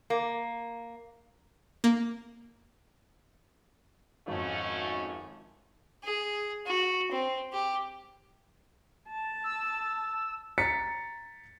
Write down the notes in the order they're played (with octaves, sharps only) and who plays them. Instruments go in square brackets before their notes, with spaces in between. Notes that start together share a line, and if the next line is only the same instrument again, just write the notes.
[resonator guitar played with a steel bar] A#3
[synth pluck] A#3
[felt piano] G#1 F2 [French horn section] G#2 A3 C#4
[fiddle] G#4
F#4
C4
G4
[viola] A5
[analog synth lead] E6
[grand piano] A#5 A6 B6 C#7